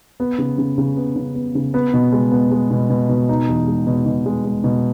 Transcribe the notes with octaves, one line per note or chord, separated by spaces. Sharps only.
B3
C#3
C#3
C#3
B3
C#3
B3
C#3
B3
B2
G#3
B3
G#3
B2
B2
B2
D#4
E2
G#3
B2
B2
G#3
G#3
B2